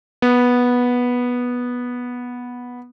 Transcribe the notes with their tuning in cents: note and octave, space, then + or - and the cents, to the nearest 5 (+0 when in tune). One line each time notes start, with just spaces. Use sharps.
B3 -10